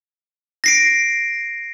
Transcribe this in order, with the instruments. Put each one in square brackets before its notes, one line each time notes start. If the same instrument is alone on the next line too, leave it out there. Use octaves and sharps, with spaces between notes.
[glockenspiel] A#6 C7 D7